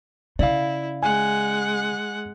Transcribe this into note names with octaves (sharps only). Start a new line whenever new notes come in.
C#3 E4 D5 F5
G#3 F#5 G#5